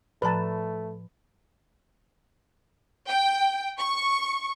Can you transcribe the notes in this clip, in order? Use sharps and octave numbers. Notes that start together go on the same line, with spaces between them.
A2 F3 A3 B4 A5 A#5
G5
C#6